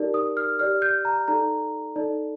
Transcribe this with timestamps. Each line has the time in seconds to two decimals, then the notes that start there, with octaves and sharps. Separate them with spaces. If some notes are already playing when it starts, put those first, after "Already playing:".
Already playing: D#4 G4 A#4 D5
0.14 D#6
0.37 F6
0.59 G4 D5 F6
0.82 G6
1.05 A#5
1.28 D#4 A4 D5 A#5
1.96 D#4 A4 D5